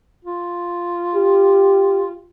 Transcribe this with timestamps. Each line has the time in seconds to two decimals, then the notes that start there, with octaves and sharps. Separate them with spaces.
0.25 F4
1.15 G4